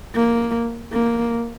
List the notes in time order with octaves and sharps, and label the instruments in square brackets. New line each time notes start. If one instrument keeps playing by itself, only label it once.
[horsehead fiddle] A#3
A#3